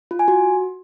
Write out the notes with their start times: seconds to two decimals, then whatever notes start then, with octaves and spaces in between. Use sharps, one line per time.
0.11 F4
0.19 G#5
0.28 F#4